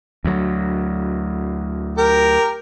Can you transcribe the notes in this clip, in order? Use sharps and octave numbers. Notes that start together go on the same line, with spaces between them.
D2 F#3
G4 A#4